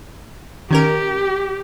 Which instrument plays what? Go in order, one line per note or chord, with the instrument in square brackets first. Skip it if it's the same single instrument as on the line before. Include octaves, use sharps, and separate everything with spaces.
[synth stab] D#3 C#4 A#4 [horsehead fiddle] G4